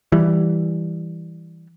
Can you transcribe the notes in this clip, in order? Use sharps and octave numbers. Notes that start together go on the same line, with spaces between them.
E3 G3